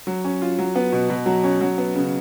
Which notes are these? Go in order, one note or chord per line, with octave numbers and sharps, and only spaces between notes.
F#3
C#4
F4
F#3
B3
B2
B2
F#3
C#4
F#3
B3
C#3